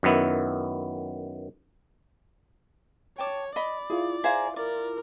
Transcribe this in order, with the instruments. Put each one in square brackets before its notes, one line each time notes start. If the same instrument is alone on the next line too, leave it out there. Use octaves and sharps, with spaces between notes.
[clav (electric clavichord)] F#2 D#3 B3 E4
[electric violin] C#5 [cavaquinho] G5 A5 D6
[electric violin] D5 [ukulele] D#5 [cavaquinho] B5
[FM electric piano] E4 F4 [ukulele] G#4
[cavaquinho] G#4 C5 A#5 [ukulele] E5 F5
[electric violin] A#4 [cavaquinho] D5